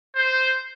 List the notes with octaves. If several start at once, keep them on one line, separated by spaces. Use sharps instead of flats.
C5